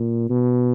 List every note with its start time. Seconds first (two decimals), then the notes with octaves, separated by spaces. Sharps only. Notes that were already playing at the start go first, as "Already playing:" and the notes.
Already playing: A#2
0.30 B2